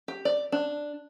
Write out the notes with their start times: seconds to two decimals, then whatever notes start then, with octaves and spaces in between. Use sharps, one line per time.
0.08 G4
0.25 D5
0.52 D4